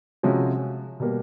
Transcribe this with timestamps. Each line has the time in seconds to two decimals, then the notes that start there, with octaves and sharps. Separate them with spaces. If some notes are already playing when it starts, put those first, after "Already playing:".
0.23 C3 F3 G#3 C#4 F#4
1.00 B2 G3 A#3